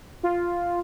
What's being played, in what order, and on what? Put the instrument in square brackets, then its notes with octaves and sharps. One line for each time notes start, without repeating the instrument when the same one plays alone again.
[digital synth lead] F4